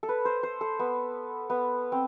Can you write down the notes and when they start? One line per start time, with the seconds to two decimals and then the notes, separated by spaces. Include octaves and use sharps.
0.03 A4
0.09 B4
0.25 C5
0.43 C5
0.61 A4
0.79 B3
1.50 B3
1.92 C4